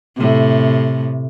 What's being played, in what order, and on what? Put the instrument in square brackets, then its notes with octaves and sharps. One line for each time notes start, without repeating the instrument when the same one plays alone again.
[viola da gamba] A2 C3